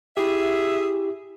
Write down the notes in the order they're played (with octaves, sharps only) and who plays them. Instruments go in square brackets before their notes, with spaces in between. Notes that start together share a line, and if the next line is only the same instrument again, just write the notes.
[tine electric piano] E4 G4 [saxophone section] G#4 E5